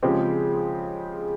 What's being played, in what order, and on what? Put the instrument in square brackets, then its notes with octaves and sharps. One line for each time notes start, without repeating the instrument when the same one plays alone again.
[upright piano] C#3 F3 G#3 C4 G4